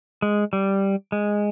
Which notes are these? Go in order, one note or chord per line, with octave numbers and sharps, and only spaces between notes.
G#3
G3
G#3